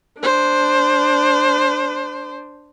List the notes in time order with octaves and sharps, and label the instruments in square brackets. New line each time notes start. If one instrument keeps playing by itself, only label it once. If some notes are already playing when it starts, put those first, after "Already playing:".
[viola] D4 C5